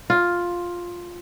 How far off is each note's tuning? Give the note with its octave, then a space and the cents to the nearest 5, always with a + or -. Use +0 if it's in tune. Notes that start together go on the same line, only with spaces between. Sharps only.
F4 +5